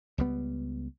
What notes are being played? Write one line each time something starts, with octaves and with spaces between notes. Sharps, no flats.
C#2 G3 B3